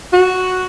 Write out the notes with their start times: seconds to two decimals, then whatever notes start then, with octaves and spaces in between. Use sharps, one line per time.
0.13 F#4